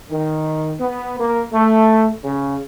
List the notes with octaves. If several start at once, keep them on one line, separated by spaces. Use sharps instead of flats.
D#3
B3
A#3
A3
C#3